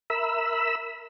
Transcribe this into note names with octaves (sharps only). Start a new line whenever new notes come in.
A#4 E5 B5 E6